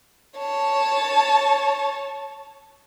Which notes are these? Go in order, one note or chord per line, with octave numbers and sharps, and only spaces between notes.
C#5 A5